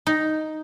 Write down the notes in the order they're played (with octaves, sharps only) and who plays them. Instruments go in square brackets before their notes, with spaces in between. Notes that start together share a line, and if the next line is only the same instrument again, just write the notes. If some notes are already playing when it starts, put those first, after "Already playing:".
[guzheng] D#4